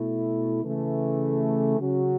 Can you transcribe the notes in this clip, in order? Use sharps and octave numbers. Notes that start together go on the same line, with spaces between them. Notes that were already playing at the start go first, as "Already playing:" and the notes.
Already playing: B2 A3 E4
C#3 E3 A3
C#3 F#3 C#4 F#4